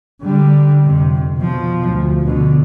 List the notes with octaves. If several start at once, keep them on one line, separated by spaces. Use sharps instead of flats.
D3 G3
F2 C3
B2 F3
D2
B2 D3